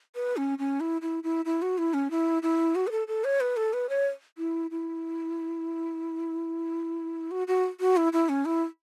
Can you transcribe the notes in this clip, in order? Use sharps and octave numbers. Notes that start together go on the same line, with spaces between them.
B4
C#4
C#4
E4
E4
E4
E4
F#4
E4
C#4
E4
E4
F#4
B4
A4
A4
C#5
B4
A4
B4
C#5
E4
E4
F#4
F#4
F#4
E4
E4
C#4
E4